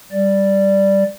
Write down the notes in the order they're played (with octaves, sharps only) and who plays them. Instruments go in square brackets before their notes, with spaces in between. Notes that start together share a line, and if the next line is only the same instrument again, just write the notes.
[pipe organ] G3 D5